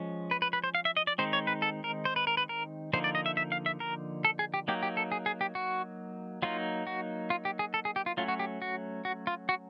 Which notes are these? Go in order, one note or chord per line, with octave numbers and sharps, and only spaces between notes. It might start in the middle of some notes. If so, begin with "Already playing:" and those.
Already playing: F3 G#3 C#4
B4
B4
B4
C5
F5
E5
D#5
D5
D#3 G#3 C4 D#4 C5
C#5
B4
A4
A#4
C5
B4
A#4
B4
A#4
D3 F3 A#3 D#4 C5
D5
D#5
E5
E5
F5
E5
A#4
A4
G#4
G4
F#3 A#3 D#4 G4
G4
A4
G#4
G#4
G4
F#4
F#3 A#3 D#4 F4
F#4
F4
G4
G#4
A4
G#4
G4
F4
F#3 A3 C#4 F4
F#4
G4
F#4
F#4
F4
F#4